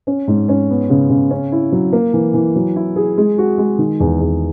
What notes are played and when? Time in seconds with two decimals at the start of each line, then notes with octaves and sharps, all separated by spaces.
0.07 C#4
0.28 G#2
0.49 C#4
0.70 B3
0.90 C#3
1.10 C#3
1.31 C#4
1.52 E4
1.72 F#3
1.93 A#3
2.13 E3
2.34 E3
2.56 F#3
2.76 E4
2.96 G#4
3.18 G#3
3.38 F#4
3.58 G#3
3.78 D#3
4.00 E2
4.21 E2